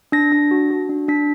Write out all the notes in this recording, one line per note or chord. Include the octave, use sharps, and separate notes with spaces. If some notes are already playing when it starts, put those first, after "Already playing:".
D4 A#6
D4
F#4
F#4
D4
D4 B6